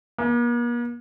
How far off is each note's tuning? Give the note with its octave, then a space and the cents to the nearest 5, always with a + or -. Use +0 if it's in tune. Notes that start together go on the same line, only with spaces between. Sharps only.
A#3 +45